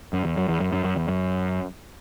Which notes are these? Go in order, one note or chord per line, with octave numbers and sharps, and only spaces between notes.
F#2
E2
F#2
E2
F#2
F#2
F#2
E2
F#2